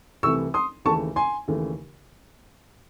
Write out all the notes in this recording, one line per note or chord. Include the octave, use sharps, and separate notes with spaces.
C2 C3 E3 A3 C#6 E6
C6 D#6
D#2 C#3 E3 A3 A5 C#6
G#5 C6
D#2 C#3 E3 A3